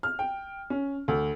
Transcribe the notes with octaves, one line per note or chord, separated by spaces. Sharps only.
F6
G5
C#4
D2